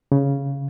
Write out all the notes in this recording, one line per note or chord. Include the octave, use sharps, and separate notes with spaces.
C#3